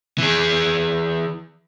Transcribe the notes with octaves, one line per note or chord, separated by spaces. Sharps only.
E3 G#4